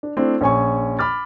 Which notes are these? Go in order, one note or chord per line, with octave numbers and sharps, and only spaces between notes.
D4
A3 C4 D4 E4
A#1 C#4 G#5 C#6
B5 D6 F6 A6